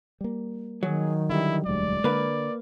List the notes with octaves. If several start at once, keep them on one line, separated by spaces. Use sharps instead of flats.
G3 A#3
D#3 F#3 G#4
D3 G3 E4
E1 D2 G3 G#3 D5
D3 A#3 B4